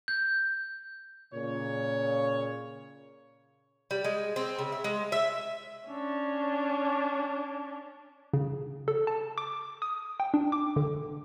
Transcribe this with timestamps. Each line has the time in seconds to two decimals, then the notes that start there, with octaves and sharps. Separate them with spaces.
0.08 G6
1.34 A#2 C#3 C#5
3.91 G3
4.04 G#3
4.36 C4
4.59 C#3
4.72 E5
4.84 G#3
5.12 E5
5.87 C#4 D4
8.33 C#3
8.88 A4
9.07 A5
9.38 D6
9.82 D#6
10.20 G5
10.34 D4
10.52 D6
10.76 D3